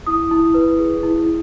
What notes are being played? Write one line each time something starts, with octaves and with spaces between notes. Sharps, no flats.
E4 D#6
E4
B4
G#4
E4
E4